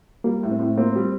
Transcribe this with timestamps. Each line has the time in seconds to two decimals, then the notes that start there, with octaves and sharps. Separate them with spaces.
0.24 G3 A#3
0.43 A2
0.51 C4
0.59 A2
0.77 A#3 C4
0.95 G3